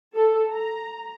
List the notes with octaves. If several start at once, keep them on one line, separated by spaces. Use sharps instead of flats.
A4
A#5